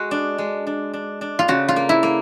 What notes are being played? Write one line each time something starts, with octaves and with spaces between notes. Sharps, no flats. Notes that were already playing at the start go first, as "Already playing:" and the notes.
Already playing: G#3 F#4
D4
G#3
D4
D4
D4
F4
C#3 F#4
F4
A#3
E4
A#3